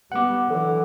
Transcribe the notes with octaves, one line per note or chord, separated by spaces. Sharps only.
G3 B3 F#5 D6
D3 E3 F#3